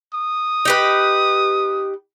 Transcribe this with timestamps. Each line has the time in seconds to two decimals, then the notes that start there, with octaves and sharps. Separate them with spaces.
0.13 D#6
0.65 D#4 G4 B4